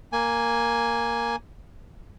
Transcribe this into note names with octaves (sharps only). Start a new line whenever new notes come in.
A#3 G#5